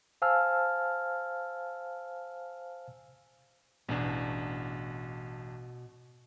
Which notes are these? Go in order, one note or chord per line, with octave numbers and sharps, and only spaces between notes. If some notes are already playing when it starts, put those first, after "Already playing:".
C5 F5 G#5 A5 E6 F6
A1 E2 B2 D4